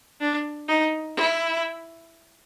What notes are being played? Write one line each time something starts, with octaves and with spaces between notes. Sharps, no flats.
D4
D#4
E4